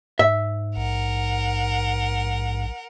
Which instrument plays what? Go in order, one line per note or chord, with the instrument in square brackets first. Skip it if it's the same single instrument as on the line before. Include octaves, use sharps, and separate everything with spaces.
[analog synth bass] G#2 [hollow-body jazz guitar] E5
[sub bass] A#1 [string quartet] A#4 F#5